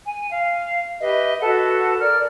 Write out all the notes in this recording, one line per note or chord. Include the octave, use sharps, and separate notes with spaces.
G#5
F5
G4 B4 D#5 E5
F#4 A4 B4 F#5
A#4 D5 F6